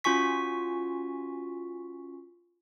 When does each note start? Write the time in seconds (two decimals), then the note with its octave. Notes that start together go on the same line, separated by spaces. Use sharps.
0.04 C#4 F4 F#4 G#5 C#6 B6